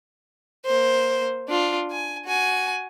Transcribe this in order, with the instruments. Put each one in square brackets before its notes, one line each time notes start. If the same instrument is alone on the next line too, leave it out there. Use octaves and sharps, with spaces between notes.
[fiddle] A#3 C5
D4 F4
G#5
F#4 G#5